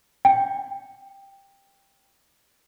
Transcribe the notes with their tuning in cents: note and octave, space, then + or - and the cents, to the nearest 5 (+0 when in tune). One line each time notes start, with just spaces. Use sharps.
G5 +10